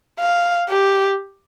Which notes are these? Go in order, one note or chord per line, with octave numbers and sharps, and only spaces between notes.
F5
G4